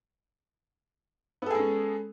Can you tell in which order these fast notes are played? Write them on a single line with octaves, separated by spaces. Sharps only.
B3 A4 G#4 G#3 C#4